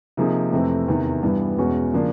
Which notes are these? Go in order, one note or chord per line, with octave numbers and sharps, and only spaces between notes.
C3 F3 A#3 D#4 G#4
F2 C3 E3 A3 C4
E2 C3 D#3
G2 E3 G3 B3
E2 B2 G#3 C#4 F#4
C#3 F3 A#3 D4